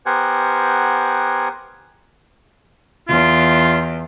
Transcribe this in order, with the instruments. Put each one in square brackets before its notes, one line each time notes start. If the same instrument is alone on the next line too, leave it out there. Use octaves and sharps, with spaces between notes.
[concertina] B3 G4 A#4 C5 F#5 G#5
[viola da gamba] E2 [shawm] F4